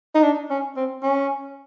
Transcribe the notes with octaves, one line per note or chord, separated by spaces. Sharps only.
D#4
D4
C#4
C4
C#4